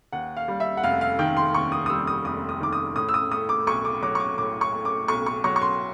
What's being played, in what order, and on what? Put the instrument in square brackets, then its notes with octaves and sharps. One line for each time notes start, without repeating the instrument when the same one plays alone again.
[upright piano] D#2 F#5
F5
G3
E5
F#5
F1 F5
F5
D#3 G5
C6
D#2 C#6
D#6
D#6
G3 E6
D#6
F1 D#6
D#6
D#3 D6
D#6
A2 D#6
E6
D#6
A3 D#6
D6
B1 C#6
D6
F#3 D6
C#6
D6
A2 D6
C#6
A3
D6
B1 C#6
C#6
F#3 C#6
C#6
C6